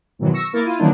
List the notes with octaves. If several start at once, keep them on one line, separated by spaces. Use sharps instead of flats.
G#2 B2 D#3 E3 F#3
C#6 E6 A#6 C#7
A#3 E4 A#4 A6
E4 F4 D#7
D#3 E3 F#3 A#3 D4 D#4